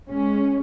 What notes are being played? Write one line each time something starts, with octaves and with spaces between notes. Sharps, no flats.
G#3 C#4